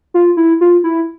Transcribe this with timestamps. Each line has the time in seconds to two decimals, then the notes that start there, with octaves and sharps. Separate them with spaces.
0.14 F4
0.37 E4
0.61 F4
0.84 E4